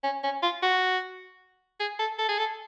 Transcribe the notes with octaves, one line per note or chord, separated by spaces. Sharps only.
C#4
C#4
F4
F#4
G#4
A4
A4
G#4
A4